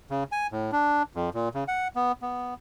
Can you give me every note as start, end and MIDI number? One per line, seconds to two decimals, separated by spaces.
0.10 0.24 49
0.32 0.47 80
0.52 0.71 45
0.72 1.03 62
1.15 1.30 41
1.35 1.49 46
1.54 1.64 49
1.68 1.88 78
1.96 2.12 59
2.22 2.54 59